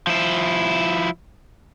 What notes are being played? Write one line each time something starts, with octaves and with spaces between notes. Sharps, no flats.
F3 E4